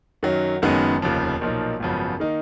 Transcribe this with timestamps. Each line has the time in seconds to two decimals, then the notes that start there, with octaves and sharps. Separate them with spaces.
0.23 F#2 D#3 F#3
0.62 F#1 F#2 D#3 G#3 B3
1.02 F1 D#2 C#3 F3
1.41 B1 A#2 F3 A#3 D#4
1.80 G#1 F#2 C#3 F3 B3
2.20 D#3 A#3 D#4